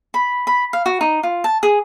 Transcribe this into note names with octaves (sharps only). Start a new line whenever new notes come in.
B5
B5
F5
F#4
D#4
F4
A5
G#4